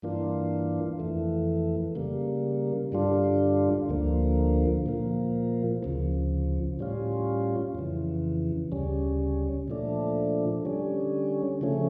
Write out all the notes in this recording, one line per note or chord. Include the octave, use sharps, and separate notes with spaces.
G2 E3 A#3 D4 F4
F2 E3 A3
C#3 G3 A#3
G2 D3 G3 D4 F4
D2 D3 F3 A#3
A#2 F3 A#3
D2 C#3 F3
A2 G3 C#4 F4
F2 C#3 E3
D2 C#3 G3 C#4
A#2 F3 A3 D4
D3 G3 C#4
C#3 F3 A3 C#4